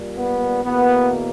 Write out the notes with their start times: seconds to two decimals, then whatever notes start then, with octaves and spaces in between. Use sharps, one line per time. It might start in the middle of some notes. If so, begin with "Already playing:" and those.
Already playing: A#2 G3 A#3
0.17 B3
0.62 E2 B2 A#3 B3